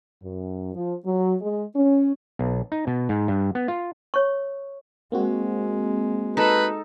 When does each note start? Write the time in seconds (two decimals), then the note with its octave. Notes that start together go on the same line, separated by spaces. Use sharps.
0.22 F#2
0.74 F3
1.05 F#3
1.42 G#3
1.76 C#4
2.39 B1
2.72 D#4
2.87 B2
3.09 G#2
3.28 G2
3.55 B3
3.68 F4
4.14 C#5 C#6
5.12 G#3 A#3 C4 F#4
6.37 D#4 A4 B4